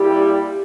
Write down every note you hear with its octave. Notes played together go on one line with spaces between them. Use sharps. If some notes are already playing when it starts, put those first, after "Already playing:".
Already playing: A#2 G3 E4 G4